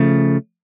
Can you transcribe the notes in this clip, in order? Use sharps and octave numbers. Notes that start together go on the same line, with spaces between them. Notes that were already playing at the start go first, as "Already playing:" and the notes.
Already playing: C#3 F3 A3